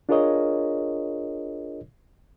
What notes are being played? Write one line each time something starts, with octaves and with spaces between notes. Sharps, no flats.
D4 F4 G#4 A#4 C#5 D#5